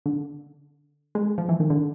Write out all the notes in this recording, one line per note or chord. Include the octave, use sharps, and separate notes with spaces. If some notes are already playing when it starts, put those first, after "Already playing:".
D3
G#3
F3
E3
D#3
D3